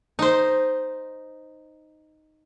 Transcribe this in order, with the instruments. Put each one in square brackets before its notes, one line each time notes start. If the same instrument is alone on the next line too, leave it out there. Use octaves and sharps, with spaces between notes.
[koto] D#4 C5